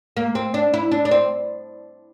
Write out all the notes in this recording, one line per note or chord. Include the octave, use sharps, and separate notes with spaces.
A#3
C4
D4
E4
D4
D4
C4